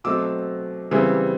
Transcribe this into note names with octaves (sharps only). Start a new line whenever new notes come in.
B2 F#3 A3 C4 D6 E6
C#3 E3 G3 C4